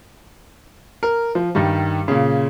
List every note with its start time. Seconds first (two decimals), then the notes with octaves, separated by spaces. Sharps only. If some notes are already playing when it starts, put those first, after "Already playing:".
1.03 A#4
1.35 F3
1.55 G2 D#3 G3
2.08 A#2 C#3